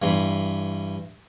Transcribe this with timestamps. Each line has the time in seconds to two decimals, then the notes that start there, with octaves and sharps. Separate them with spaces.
0.02 G2 E3 C6